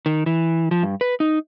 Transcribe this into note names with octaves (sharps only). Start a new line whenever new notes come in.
D#3
E3
F3
G2
B4
D#4